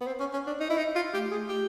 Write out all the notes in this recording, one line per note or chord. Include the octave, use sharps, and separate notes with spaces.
B3
C4
C#4
C#4
D4
D#4
E4
D#4
F4
A3 G4
G#4
G4